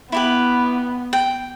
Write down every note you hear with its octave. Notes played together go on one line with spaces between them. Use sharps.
B3 E4 G4 B4
G5